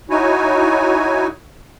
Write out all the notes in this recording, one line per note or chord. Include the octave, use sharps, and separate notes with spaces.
D#4 E4 F#4 C#5 G#5